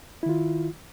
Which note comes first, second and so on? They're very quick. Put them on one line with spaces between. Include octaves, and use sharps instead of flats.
E4 D#3 F4